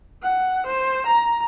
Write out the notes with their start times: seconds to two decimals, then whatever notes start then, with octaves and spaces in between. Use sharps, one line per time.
0.23 F#5
0.66 C5
1.06 A#5